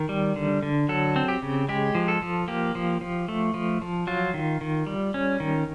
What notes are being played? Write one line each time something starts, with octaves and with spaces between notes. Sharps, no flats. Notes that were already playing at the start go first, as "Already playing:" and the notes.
Already playing: D#3 A#4
G3
D3
D3
F#3 A4
C4
G4
C#3
G#3 G4
F3
A4
F3
A#3 G4
F3
F3
A3
F3
F3
F#3 F4
D#3
D#3
G3
C#4
D#3